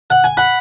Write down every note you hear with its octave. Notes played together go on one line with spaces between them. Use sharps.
F#5
G#5
F#5 B5